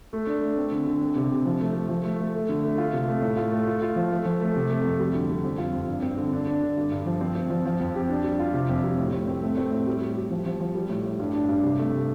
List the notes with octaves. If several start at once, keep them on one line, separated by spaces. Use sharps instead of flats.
A3
D4
A3
C4
D3
D3
C4
C3
C3
F3
A3
A3
F3
A3
A3
A3
D3
A3
F4
C3
A3
A2
F4
A3
F4
F4
F3
A3
F3
A3
C3
A3
F2
G3
D3
D3
F2
F4
F2
G2
C4
D3
D4
D4
D3
G2
G2
F3
C4
C4
F3
F3
F2
G4
D4
G3
F4
C3
F2
G3
A2
A2
C4
A3
C4
A2
G3
G3
G3
F3
F3
F3
G3
A2
A2
G2
D4
G2
C3
A3
C3